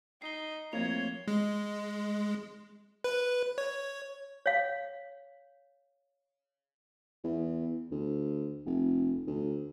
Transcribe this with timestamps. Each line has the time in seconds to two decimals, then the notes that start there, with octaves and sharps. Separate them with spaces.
0.22 D#4 C7 G7
0.73 F3 A3 A#3 C4 C#5 G#6 F7
1.28 G#3
3.04 B4
3.58 C#5
4.46 C#5 F5
7.24 E2
7.92 D2
8.66 F1
9.27 D2